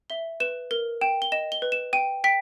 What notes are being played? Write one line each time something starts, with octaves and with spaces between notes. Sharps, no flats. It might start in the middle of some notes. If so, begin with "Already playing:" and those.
E5 G7
B4 E7
A#4 G7
G5 E7
G7
D#5 E7
G7
B4
E7
G5 D#7
G5 B6